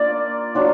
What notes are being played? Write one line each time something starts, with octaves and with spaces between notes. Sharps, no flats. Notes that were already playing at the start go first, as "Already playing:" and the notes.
Already playing: A#3 D4 F4 D5
F#3 D4 F4